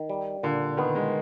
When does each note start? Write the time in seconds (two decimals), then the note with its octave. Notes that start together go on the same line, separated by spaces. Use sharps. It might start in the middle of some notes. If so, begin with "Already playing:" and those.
Already playing: D#3
0.10 G3
0.43 A#2 D3
0.77 D#3 B3
0.95 G#3